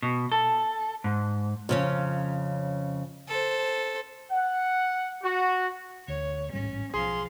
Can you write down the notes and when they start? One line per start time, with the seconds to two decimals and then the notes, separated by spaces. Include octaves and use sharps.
0.02 B2
0.32 A4
1.04 G#2
1.69 F2 C#3 C#4
3.28 A4 C5
4.30 F#5
5.23 F#4
6.08 D2 C#5
6.53 A1 G#2 G3 C#4
6.94 B1 F3 G#4 F5 C6